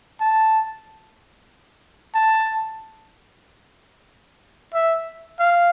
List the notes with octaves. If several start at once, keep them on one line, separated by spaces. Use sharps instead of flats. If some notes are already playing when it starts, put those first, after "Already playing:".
A5
A5
E5
F5